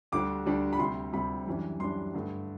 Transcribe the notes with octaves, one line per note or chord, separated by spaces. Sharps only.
D2 D3 G3 D4 D6
D2 D3 G3 D4
B5
D2 C3 G3 C6
D2 C3 G3 B5
F#2 E3 G3 D4
F#2 E3 G3 D4 C6
G2 D3 A3